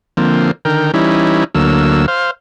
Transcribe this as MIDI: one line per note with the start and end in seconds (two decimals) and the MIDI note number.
0.17 0.51 50
0.17 0.51 53
0.17 0.51 58
0.17 0.51 60
0.65 0.91 50
0.65 0.91 51
0.65 0.91 70
0.65 0.91 79
0.94 1.44 52
0.94 1.44 55
0.94 1.44 61
0.94 1.44 63
0.94 1.44 64
1.55 2.06 38
1.55 2.06 50
1.55 2.06 54
1.55 2.06 58
1.55 2.06 88
2.08 2.31 72
2.08 2.31 77